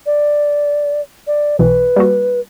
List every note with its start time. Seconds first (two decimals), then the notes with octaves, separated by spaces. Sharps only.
0.06 D5
1.27 D5
1.59 B1 B2 E3 B4
1.96 G3 A#3 F#4